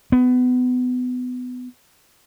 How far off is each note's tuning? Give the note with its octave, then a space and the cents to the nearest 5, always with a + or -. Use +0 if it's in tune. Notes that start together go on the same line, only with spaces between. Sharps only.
B3 +25